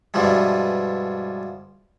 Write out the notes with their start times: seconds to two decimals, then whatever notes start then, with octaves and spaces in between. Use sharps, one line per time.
0.14 G2 B2 E3 F3 G3 G#3